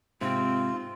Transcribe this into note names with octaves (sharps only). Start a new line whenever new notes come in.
G#2 C3 C4 F4